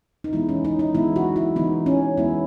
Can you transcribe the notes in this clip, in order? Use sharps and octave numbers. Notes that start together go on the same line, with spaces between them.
D#4
E3 G#3 B3 E4
C#4
D#4
D#4
E3 G#3 B3 E4
F#4
E4
E3 G#3 B3 D#4
C#4
E3 G#3 B3 E4